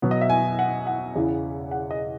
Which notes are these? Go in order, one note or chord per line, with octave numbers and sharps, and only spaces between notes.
B2 F#3 B3
D#5
E5
G#5
F#5
F#5
E2 C#3 E3
F#5
D#5